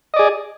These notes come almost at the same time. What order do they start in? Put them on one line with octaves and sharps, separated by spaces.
D#5 D5 G#4